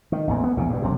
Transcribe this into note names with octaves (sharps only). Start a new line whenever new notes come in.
D#3
A1 E2 A#2
B3
A#1 E2 C#3
G2 B2
E1 F#2 C3